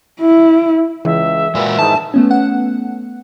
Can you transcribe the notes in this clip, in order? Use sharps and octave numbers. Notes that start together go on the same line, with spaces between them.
E4
C#2 E3 E5
A#2 G#3 F#4 B4 F#5
G#2 D#3 E3 A5
A3 B3 C#4
F#5